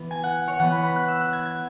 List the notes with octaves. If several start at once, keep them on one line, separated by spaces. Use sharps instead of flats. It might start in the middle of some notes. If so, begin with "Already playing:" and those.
Already playing: E3 B3
G#5
F#5
C#5
E3 B3 F#5
B5
B5
F#6
E6
F#6
G#6
G#6